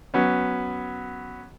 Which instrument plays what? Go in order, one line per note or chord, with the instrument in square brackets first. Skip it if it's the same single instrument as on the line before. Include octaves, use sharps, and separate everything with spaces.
[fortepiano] F#3 B3 C#4